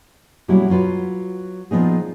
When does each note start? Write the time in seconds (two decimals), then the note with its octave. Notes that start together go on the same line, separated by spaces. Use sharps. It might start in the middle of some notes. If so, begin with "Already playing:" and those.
0.48 B2 F#3 G3 A#3 C#4 E4
0.70 F#3 F4 B4
1.71 A#2 F3 B3 D#4 G#4